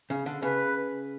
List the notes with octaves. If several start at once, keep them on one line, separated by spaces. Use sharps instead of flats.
C#3
D3
C#3 B4